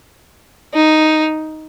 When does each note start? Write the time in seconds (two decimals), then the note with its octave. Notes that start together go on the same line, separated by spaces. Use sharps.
0.74 D#4